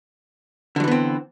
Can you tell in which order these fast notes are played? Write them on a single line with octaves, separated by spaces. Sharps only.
D3 F#3 E3 B3 C4